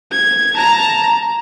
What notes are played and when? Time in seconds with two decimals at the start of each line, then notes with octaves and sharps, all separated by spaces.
0.12 G#6
0.55 A5 A#5